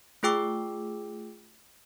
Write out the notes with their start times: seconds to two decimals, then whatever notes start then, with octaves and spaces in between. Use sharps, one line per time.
0.23 A3 F4 G#4 G5 D6 E6